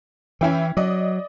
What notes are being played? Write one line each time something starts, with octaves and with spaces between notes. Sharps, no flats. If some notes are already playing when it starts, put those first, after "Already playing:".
E3 C#4 E4 G5
F#3 D5 D#5